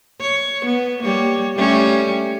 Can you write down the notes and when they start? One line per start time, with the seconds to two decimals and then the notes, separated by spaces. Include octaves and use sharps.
0.21 C#5
0.65 B3
1.02 G3 A#3 C#5
1.56 G3 A3 C#4